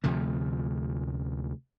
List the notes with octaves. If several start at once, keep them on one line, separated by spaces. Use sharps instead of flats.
D2 C3 F3 A3